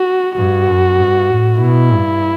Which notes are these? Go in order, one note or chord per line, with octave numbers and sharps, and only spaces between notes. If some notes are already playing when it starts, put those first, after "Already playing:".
Already playing: F#4
G2 F#4
F#2
G2
A2
B2 E4
G2